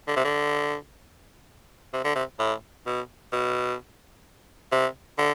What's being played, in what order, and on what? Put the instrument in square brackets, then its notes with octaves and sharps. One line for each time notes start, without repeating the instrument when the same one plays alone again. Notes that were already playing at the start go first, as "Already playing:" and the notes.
[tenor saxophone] D3
C3
D3
C3
D3
C3
A2
B2
B2
C3
D3